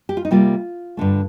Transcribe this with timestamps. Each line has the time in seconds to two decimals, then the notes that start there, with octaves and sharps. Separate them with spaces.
0.09 G4
0.17 F4
0.25 D#4
0.31 C3 G3 A#3 F4
0.97 G2 D3 A3